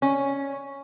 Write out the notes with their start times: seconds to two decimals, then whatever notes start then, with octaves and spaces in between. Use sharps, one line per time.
0.02 C#4